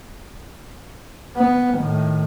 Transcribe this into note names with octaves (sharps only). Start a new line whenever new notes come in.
B3
A2 D#3